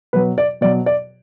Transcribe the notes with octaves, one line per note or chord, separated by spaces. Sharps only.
B2 F#3 B4
D5
B2 F#3 D5
D5